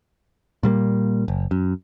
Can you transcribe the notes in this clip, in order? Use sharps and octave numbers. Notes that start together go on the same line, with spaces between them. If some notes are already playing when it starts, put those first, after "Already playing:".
A#2 G3 A3 A#3
F#1
F#2